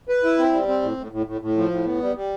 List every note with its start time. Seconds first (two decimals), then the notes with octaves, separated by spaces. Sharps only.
0.09 B4
0.24 E4
0.39 C4
0.52 G3
0.68 C4
0.82 A2
0.97 A2
1.12 A2
1.26 A2
1.41 A2
1.57 F3
1.71 A2
1.86 B3
2.02 G3
2.16 G3